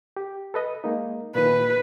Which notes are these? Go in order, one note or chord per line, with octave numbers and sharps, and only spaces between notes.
G4
A4 B4 D#5
G#3 A#3 D#4
A#2 D#3 B4